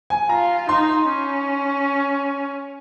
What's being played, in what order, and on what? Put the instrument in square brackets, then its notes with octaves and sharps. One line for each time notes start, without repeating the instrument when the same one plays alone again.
[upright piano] G#5
[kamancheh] F4 [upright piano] A#5
[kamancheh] D#4 [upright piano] C6
[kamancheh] C#4